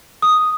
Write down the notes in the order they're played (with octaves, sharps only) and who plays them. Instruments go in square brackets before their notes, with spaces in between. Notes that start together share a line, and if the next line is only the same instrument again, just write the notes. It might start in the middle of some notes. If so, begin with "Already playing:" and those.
[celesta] D#6